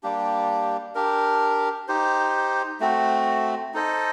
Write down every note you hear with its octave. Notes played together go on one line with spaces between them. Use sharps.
G3 A#3 D4 G4
D4 G4 A#4
D#4 G4 C5
A3 C4 F#4
D#4 A4 C5 D#5